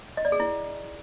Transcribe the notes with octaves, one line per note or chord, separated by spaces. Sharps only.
D#5
D5
G#4
E4